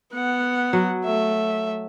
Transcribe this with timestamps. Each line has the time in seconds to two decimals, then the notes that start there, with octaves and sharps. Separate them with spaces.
0.14 B3 F#5
0.73 F#3
1.05 A3 E5